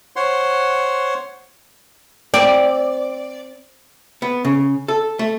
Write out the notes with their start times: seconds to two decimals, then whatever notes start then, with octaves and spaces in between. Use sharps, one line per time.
0.16 C5 C#5 F#5 C6
2.34 C4 D5
4.22 B3
4.45 C#3
4.88 A4
5.19 A3